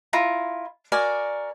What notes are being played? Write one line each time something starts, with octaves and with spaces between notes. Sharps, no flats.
E4 F4 A#5
F#4 A#4 D5 G#5